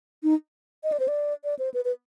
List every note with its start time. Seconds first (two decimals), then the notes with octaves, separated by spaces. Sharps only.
0.23 D#4
0.84 D#5
0.92 D5
1.00 C5
1.08 D5
1.44 D5
1.59 C5
1.74 B4
1.85 B4